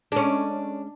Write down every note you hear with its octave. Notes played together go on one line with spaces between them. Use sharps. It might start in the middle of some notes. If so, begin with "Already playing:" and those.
G#3 C#4 D4